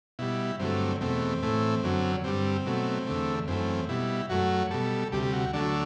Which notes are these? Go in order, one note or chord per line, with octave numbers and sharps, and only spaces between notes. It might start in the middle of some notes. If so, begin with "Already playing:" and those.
B2 G3 E4
G2 D3 F#3 A3 C4
E2 B2 A3 C4
A2 E3 A3
F#2 D3 F#3
G2 D3 G3 C4
B2 F#3 A3
E2 D3 A3
F#2 E3 A3 C4
B2 G3 E4
F#2 F#3 A3 F#4
B2 G3 A4
D2 C3 G3 G4
G4
F#4
D2 D3 F#3 A3 D4